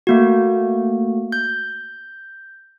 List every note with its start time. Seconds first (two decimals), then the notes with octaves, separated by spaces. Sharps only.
0.07 A3 A#3 F#4
1.32 G6